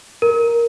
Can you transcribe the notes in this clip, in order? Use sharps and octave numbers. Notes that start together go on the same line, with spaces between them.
A#4